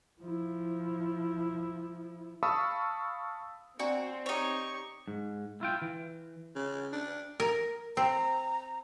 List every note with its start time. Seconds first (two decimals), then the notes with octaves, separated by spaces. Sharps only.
0.21 F3 E4
2.43 F5 A5 B5 C#6 D#6 E6
3.79 C4 D4 F#4 D5 A#5
4.26 D#4 G4 C#5 C#6
5.08 G#2
5.61 E4 F4 G5
5.82 E3
6.55 C#3
6.93 D4
7.40 A#4
7.97 C4 A#5